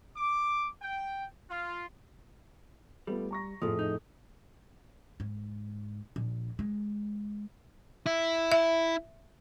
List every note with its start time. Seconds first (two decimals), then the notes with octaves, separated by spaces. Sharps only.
0.16 D6
0.81 G5
1.49 F4
3.07 G3 A3 B3 F4
3.31 A#5 C#6 A#6
3.62 F2 A2 F3 G#4 A4 D#6
3.79 D#4
5.20 G#2
6.16 A#1
6.59 G#3
8.06 E4
8.52 E5